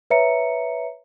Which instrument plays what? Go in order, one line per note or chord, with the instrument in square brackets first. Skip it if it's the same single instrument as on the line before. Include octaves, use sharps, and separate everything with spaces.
[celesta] B4 C#5 E5 A#5 C#7